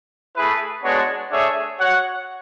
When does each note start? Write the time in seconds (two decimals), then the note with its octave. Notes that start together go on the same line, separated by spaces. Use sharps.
0.36 A3 E4 G#4 B4
0.84 G#3 B3 D4 F#4 C#5
1.31 A3 D4 G#4 C#5 E5
1.79 F#4 C#5 F#5